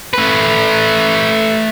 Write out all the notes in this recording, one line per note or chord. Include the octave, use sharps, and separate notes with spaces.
A3 B4